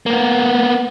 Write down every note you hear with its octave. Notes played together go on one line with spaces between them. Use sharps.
A#3 B3